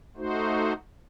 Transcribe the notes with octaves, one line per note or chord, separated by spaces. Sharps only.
A3 D#4 F#4 C5